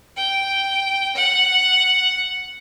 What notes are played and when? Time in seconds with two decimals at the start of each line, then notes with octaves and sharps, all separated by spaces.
0.17 G5
1.16 F#5